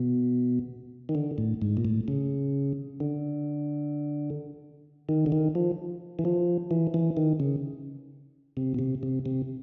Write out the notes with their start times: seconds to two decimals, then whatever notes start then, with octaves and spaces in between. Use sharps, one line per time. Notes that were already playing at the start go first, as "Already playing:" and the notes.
Already playing: B2
1.09 D#3
1.15 D3
1.38 A2
1.62 G#2
1.77 A#2
1.85 A2
2.08 C#3
3.00 D3
5.09 D#3
5.26 D3
5.32 D#3
5.55 F3
6.19 E3
6.25 F3
6.71 E3
6.94 E3
7.17 D#3
7.40 C#3
8.57 C3
8.74 B2
8.79 C3
9.03 C3
9.26 C3